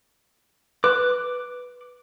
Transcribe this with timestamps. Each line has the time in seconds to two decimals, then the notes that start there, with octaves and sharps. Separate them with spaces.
0.84 B4 D6 F#6